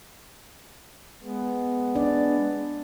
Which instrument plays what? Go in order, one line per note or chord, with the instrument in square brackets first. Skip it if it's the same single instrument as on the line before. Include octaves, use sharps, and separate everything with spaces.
[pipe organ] G#3 B3
[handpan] D4 D5